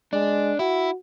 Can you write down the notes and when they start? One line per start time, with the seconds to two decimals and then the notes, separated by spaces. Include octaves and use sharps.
0.13 G#3 D4
0.59 E4 F#4